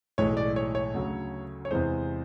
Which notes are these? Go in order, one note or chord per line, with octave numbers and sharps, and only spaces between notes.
B1 A2 E3 G#3 C#5
D5
C#5
C#5
D2 C#3 F#3
C#5
E2 C3 E3 G#3 C5